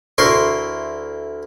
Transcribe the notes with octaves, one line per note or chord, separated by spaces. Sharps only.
D2 E4 A#4 C6 C#6